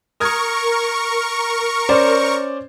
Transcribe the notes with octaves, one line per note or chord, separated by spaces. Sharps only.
A#4 C#6 D#6 F6 G#6
C#4 C5 D5